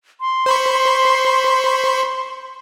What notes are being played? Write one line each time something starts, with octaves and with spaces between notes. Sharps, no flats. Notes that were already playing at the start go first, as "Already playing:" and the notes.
C6
C5 B5 C#6